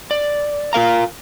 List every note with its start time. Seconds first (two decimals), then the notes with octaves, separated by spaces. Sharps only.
0.11 D5
0.73 F4 A#4 F5 A#5